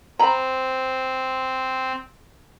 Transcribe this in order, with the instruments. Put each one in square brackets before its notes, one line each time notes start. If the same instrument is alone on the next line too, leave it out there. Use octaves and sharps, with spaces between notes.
[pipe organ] C4 [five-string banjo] A#5 B5